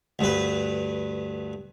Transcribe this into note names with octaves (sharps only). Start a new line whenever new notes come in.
D2 G2 B4